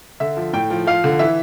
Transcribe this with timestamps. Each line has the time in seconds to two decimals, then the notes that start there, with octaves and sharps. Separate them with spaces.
0.20 D3 E5
0.37 F3
0.53 A2 G5
0.70 F3
0.87 F3 F5
1.04 D3
1.19 E3 E5